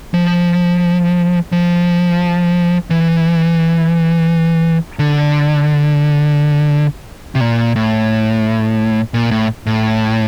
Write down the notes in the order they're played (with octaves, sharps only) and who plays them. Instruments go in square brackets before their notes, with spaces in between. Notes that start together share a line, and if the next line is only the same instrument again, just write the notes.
[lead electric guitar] F3
F3
E3
D3
C3
A#2
A2
A#2
A2
A2